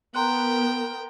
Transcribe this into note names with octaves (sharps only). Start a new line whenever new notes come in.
B3 A#4 G5 A#5 C6 F#6